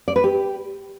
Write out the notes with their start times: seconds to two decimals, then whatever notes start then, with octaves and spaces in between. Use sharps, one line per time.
0.08 D5
0.16 B4
0.24 G4